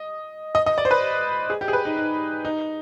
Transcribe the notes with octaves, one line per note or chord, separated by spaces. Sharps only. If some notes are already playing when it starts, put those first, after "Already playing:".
Already playing: D#5
D#5
D#5
D5
C5
B4
G#4
G4
G#4
B4
D#4
D#4
D#4